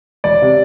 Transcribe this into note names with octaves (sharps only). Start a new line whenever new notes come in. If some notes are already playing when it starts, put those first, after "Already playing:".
E1 D5
C3